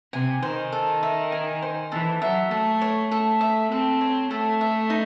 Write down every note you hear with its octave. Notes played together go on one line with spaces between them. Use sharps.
C3 G#5
D#3 C5
A4
E5
G#5
C5
E3 A4
F#3 E5
A3 A4
C#5
A3 A4
E5
C4 A4
C#5
A3 A4
E5
D#4